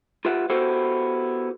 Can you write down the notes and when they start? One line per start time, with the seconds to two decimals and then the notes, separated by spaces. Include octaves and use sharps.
0.25 F4 G4 B4 E5 F#5
0.50 B3 E4 F#4 G4 A4 C5